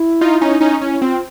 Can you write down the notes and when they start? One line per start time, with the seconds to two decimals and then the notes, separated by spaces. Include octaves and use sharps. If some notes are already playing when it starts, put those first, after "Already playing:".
Already playing: E4
0.21 D#4 F4
0.41 C#4 D#4
0.61 C#4 D#4
0.81 C#4 E4
1.01 C4 F4